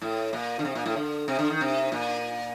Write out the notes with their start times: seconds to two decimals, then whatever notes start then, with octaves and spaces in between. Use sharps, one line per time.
0.02 A2
0.33 A#2
0.59 D3
0.65 C3
0.75 A#2
0.86 A2
0.96 D3
1.28 C3
1.39 D3
1.50 D#3
1.61 C3
1.92 A#2